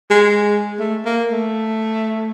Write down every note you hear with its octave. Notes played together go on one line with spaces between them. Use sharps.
G#3
A3
A#3
A3